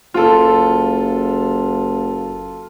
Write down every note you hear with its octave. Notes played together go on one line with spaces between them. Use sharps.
F#1 F4 A4